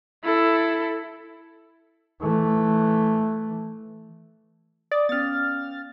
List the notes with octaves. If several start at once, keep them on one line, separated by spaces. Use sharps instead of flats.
E4 A4
E3 A3
D5 D#6
B3 C#4 F6 A6